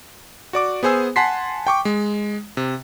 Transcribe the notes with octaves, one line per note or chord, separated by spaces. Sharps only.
F#4 D5 D6
B3 G#4 C5 G#5 E6
F#5 G#5 A5 C6 B6 C7
G5 C#6 D6
G#3
C3